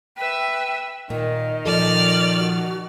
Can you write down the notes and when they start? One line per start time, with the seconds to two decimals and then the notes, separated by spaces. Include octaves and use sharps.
0.17 B4 E5 G5
1.10 A#2 D#3 A#3 D#5
1.66 A#2 F3 A4 D5 F6
2.37 F#4